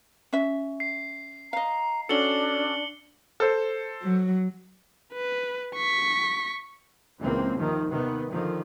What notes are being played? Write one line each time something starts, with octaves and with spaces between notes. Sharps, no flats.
C#4 E5
C7
D#5 F5 A#5
C#4 D4 F#4 A4 C#7 F#7 G7
A4 C5
F#3
B4
C#6 B6
C#2 E3 A#3 C4
D#2 C3 D#3 F3
C3 D#3 B3
D3 D#3 F3